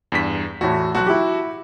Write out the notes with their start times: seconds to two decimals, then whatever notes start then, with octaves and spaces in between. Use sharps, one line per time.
0.12 E2 G2 B6
0.61 E2 A2 F#4
0.95 B1 F#4 A5 F#6
1.07 E4 G4